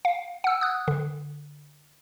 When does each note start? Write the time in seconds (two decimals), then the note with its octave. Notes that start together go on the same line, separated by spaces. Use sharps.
0.05 F5
0.44 F#5 E6
0.61 D#6 F#6
0.88 D3